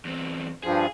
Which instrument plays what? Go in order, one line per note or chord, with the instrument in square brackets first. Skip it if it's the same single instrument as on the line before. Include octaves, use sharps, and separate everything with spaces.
[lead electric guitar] E2 C4
[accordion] G2 F3 [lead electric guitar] G#4